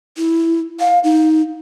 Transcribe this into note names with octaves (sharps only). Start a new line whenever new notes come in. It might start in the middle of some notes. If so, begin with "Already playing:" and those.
E4
F5
D#4